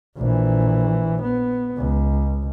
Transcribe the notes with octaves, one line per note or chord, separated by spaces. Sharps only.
A#1 E3
B3
C#2